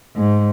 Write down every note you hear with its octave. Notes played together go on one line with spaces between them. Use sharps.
G#2